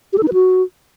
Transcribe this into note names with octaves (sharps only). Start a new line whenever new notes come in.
G4
A4
D#4
B4
F#4